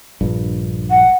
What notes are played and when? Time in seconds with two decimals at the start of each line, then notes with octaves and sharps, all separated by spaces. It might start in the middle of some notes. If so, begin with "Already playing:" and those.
0.21 A#1 G2
0.90 F#5